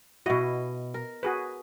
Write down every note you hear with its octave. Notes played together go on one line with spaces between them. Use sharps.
B2 E4 F#4 D#5
A#4
F#4 G#4 B4